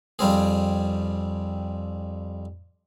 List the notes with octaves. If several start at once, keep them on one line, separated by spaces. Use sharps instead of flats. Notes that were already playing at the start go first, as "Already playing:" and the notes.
F2 G3 C4 G#4